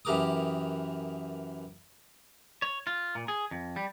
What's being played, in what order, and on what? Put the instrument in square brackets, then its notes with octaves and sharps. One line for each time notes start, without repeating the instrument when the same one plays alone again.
[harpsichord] F#2 E3 G4 A#4 D6 D#6
[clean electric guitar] C#5
F4
A#2
G#4
F2
G3